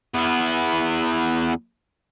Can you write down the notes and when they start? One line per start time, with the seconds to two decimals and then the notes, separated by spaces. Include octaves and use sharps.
0.14 E2 B3